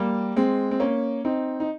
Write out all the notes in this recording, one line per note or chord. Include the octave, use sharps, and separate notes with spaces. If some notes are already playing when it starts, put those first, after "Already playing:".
Already playing: G3 A#3
G#3 C4
C4
A#3 C#4
C4 D#4
D#4